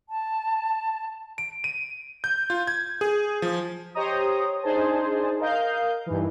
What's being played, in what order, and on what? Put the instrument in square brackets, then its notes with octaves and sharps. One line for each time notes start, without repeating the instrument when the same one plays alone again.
[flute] A5
[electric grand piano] D7
D#7
G6
F4
G#6
G#4
F3
[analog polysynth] G4 C5 C#5 D#5 A#5 D#6
D4 D#4 G#4 C5 A5
A#4 D#5 F5 G6
G2 D#3 E3